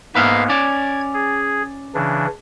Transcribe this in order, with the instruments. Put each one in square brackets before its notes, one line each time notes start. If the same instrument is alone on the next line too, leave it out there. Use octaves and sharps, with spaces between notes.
[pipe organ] G#2 A#3 B3 [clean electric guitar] B4 E5 F5
[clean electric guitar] C#4 D5 [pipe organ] G#6
[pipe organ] G#4
C#3 E3 D4